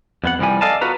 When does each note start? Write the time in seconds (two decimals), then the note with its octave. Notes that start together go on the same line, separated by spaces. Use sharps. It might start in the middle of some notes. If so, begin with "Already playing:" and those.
0.24 F2 B3 F#5
0.39 C2 E3 F3 G3 G#5
0.61 A4 D5 D#5 F5 G#5 A5
0.81 B3 F4 F#4 B4 A#5